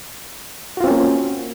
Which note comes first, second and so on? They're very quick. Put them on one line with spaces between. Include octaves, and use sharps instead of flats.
F#4 F4 C4 C#4 A#3